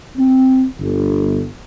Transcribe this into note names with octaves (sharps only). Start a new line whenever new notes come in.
C4
G1